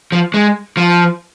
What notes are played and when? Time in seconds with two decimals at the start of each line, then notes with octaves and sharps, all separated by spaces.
0.12 F3
0.34 G#3
0.77 F3